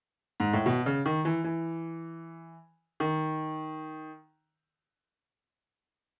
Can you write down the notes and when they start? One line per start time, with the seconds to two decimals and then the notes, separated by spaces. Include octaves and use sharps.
0.40 G#2
0.53 A2
0.66 B2
0.86 C#3
1.06 D#3
1.25 E3
1.44 E3
3.00 D#3